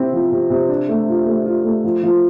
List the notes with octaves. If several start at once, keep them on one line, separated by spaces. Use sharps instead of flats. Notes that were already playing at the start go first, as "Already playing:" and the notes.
Already playing: C3 C4 E4
F3
C3
C3
D4
A3
F4
A3
F4
A3
F3
F3